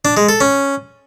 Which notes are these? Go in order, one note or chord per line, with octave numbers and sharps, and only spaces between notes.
D4
G#3
A4
C#4